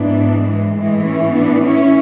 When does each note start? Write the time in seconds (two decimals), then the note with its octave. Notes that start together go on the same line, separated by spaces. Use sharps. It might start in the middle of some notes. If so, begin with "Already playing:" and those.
Already playing: G#2 E3 B3 D4
0.46 G#3
0.75 A2 E3 G#3
1.04 C#4 E4
1.33 B3 D4
1.63 C#4 E4